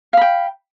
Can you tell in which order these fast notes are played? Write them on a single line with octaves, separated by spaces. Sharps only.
F5 B5 G5